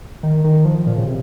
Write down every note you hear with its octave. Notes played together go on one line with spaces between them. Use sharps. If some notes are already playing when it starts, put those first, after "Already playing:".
D#3
D#3
F3
A#2
C#3
C3